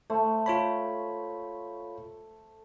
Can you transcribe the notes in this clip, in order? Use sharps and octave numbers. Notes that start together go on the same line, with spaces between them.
A3 C5
F4 C#5 B5